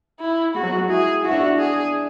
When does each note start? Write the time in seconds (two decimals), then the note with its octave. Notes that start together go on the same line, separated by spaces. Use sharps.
0.20 E4
0.54 G#3 F#4
0.63 F#3
0.72 G#3
0.81 F#4
0.89 E4 G#4
1.24 E4 F#4
1.31 D4
1.38 E4
1.59 G#4